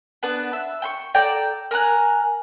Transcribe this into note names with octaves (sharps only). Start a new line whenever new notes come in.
B3 D4 B4
E5
G5 B5 C#6
A4 D5 G5 A#5
A#4 G#5 A#5 F#6